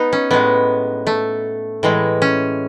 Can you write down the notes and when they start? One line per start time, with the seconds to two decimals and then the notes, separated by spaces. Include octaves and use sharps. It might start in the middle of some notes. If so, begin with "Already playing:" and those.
Already playing: B3 D#4
0.13 C#4
0.31 A2 G#3 B3
1.07 A3
1.83 A2 E3 G#3
2.22 C#4